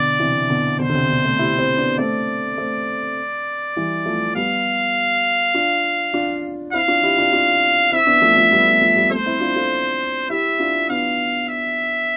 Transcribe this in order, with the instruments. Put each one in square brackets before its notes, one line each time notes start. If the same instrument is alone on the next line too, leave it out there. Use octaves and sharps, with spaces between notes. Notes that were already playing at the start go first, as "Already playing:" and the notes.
Already playing: [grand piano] B2 D3 [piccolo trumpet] D5
[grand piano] C3 E3
B2 D3
[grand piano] B2 D3 [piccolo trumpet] C5
[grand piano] D3
C3
B2 D3
A3 C4
E4 G4
C4 E4
B3 D4
[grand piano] A3 C4 [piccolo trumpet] D5
[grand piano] A3 C4
E3 G3
F3 A3
[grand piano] G3 B3 [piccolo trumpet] F5
[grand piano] D4 F4
D4 F4
[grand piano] C4 E4 [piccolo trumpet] F5
[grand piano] D4 F4
E4 G4
D4 F4
D4 F4
[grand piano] C4 E4 [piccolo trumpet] E5
[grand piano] B3 D4
F3 A3
F3 A3
G3 B3
F3 A3
F3 A3
G3 B3
[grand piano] A3 C4 [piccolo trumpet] C5
[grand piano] C4 E4
D4 F4
F4 A4
[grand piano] E4 G4 [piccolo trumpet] E5
[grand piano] D4 F4
[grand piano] B3 D4 [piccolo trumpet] F5
[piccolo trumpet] E5